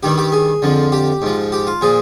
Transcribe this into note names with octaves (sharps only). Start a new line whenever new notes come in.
G2 D#3 G3 G4
G4
G#4
F2 D3 F3
G4
G#2 F3
G4
F4
A#2 F3 G#4